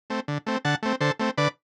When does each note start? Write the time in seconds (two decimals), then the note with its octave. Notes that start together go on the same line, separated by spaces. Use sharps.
0.10 A3 C4
0.28 D3
0.47 A3 C4
0.65 D3 F#5 A5
0.83 A3 C4
1.01 D3 A4 C5
1.19 A3 C4
1.38 D3 B4 D5